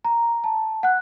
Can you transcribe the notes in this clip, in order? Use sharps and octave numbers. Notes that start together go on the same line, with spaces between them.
A#5
A5
F#5 F#6